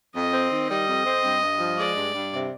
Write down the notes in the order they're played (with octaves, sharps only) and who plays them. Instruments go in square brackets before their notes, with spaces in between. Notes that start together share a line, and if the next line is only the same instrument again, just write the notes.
[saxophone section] F2 [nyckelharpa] D#5
[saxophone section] C4
D#3
[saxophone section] G3 [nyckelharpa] D#5
[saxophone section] F2
C4
G2
G2
F3
[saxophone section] G#3 [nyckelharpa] D5
[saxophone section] G2
G2
C3